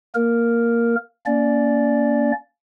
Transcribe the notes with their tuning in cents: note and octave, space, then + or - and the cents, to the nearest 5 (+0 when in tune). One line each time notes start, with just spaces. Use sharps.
A#3 +0 A#4 +0
A#3 +0 C#4 +30 D5 +0